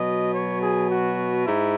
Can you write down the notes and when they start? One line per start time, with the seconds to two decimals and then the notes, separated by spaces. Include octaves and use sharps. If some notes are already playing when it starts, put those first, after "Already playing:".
Already playing: B2 F#3 D#5
0.34 C#5
0.62 G#4
0.90 F#4
1.46 G#2 E4